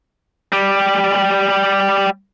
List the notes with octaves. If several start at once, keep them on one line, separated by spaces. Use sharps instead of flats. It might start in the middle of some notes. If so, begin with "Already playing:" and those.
G3 G4